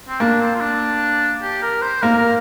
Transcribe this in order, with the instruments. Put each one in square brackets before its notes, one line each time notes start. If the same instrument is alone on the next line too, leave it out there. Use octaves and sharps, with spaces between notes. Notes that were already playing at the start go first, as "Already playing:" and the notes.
[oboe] C4
[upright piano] A#3 [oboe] D4
[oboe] C4
F4
D4
G4
A#4
C5
[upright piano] A#3 [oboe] A#4
[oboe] A#4